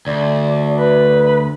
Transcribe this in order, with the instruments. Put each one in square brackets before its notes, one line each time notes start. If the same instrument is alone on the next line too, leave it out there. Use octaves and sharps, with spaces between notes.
[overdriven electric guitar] D2 [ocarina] D5
[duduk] B4